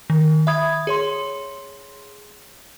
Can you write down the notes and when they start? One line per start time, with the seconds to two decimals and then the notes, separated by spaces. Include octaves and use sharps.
0.10 D#3
0.47 E5 B5 D#6 G#6
0.87 G#4 C#5 C6